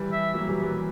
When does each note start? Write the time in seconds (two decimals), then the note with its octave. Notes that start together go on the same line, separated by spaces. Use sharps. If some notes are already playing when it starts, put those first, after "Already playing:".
Already playing: E3 G3
0.12 E5
0.34 F#3 A#3
0.48 E3 G3
0.62 E3 G3